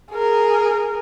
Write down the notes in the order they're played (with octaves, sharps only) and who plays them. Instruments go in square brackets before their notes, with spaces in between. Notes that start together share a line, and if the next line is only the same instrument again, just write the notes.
[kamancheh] G#4 A#4